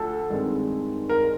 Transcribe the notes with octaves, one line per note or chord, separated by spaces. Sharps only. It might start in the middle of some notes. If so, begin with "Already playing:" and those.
Already playing: D2 F3 A4
G2 D#3 G#3 C4
A#4